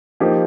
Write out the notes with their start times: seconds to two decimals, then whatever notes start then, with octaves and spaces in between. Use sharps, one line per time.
0.20 F3 A#3 D#4 G4